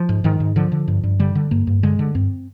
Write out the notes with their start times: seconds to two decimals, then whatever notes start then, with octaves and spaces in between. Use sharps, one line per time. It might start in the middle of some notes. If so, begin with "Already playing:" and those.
Already playing: F3
0.09 G#2
0.24 G#2 D#3
0.40 G#2
0.56 D3 F3
0.72 D3
0.88 G2
1.03 G2
1.20 D3 G3
1.35 D3
1.51 G2 A#3
1.67 G2
1.83 D3 G#3
1.99 D3
2.15 G2 C4